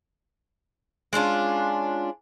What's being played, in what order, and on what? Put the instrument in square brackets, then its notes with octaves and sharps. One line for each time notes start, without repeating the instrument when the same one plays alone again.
[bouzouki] G#3 C#4 D4 F4